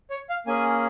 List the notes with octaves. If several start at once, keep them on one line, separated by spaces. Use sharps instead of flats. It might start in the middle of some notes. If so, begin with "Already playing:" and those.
C#5
F5
A#3 C#4 G#4 G#5